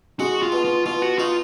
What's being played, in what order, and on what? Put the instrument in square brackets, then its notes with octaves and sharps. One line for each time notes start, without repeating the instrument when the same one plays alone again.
[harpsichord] G#3 [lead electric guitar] F#4
[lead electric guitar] F4
[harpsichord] B2
[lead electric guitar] F4
[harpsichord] B2 [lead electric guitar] F4
[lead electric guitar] F#4
[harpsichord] D#4 [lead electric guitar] F4